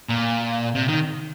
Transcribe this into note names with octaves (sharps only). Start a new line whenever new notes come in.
A#2
C3
D#3